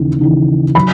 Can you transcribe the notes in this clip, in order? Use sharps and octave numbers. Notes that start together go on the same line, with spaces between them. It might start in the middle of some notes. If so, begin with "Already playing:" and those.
Already playing: D#2 C#3 E3
D#2 C#3 E3
F#3 B5